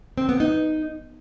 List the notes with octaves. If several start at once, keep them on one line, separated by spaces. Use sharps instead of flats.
C4
B3
D#4